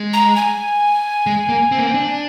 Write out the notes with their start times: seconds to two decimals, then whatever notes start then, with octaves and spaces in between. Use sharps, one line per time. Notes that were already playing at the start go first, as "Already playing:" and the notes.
Already playing: G#3
0.13 A#5
0.36 G#5
1.26 G#3
1.49 A#3
1.72 C4
1.78 A#3
1.86 C4
1.94 D4